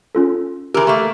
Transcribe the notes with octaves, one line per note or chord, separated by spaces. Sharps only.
C#4 F4 A4
E3 G4 A#4 E6
A3 A#3